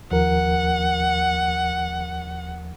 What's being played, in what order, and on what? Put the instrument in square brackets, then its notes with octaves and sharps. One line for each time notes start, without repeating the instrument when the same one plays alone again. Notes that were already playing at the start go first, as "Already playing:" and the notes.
[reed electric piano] D#2 F3 A#4 [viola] F#5